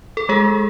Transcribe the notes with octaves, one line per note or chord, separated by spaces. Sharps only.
A4
G#3 G#4